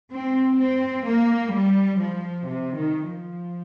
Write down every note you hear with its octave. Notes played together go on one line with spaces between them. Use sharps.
C4
C4
A#3
G3
F3
C3
D#3
F3